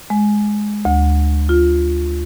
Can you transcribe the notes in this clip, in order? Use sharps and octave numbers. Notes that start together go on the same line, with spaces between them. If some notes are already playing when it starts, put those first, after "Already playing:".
G#3
D2
F4